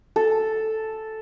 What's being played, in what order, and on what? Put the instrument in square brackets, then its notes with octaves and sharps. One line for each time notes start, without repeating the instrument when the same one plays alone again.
[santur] A4